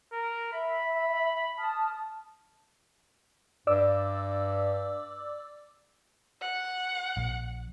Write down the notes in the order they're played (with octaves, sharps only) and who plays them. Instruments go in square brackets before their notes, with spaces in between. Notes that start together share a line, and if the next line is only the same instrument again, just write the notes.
[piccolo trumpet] A#4
[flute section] E5 [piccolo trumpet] B5
[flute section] A5 D#6 F6
[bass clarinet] G2 [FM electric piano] D5 D6 E6
[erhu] F#5
[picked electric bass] A#1